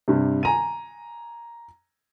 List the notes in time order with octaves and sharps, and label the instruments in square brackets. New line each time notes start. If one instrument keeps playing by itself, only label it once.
[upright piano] G2 C3
G#5 A#5 D#7